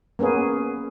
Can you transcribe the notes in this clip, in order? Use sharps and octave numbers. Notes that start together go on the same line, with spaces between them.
A#3 B3 C#4 G#4